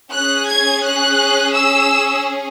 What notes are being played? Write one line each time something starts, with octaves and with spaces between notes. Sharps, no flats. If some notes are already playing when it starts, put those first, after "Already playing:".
C#4 G#4 F#6
G#6
F#6
E6